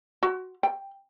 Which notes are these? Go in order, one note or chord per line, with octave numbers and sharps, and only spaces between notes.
F#4
G5